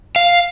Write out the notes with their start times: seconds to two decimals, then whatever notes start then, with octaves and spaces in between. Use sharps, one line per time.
0.16 F5